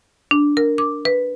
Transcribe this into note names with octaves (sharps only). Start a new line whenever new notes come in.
D4
A#4
D6
B4